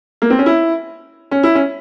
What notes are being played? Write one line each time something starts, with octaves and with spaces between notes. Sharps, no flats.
A#3
C4
C#4
E4
C#4
E4
C#4